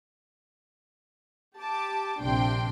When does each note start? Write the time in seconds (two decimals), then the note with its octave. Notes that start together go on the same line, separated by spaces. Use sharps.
1.60 G4 A5 D6
2.22 A#1 C3 D4 G5 C6